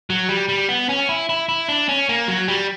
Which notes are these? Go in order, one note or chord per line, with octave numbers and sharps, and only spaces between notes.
F#3
G3
G3
B3
C#4
E4
E4
E4
D4
C#4
A#3
F#3
G3